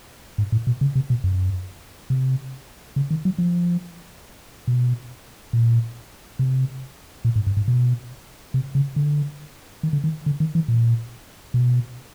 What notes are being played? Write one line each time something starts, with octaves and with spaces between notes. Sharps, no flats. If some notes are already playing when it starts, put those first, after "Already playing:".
G#2
A2
B2
C#3
C3
B2
F#2
C3
C#3
D#3
F#3
F3
B2
A#2
C3
A#2
G#2
G2
G#2
B2
C3
C#3
D3
D#3
D3
D#3
D3
D#3
E3
A#2
B2